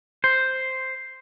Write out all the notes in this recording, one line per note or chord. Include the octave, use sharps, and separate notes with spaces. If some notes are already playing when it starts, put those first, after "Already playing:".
C5